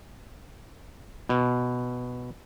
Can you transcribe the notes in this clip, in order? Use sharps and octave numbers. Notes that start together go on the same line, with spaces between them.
B2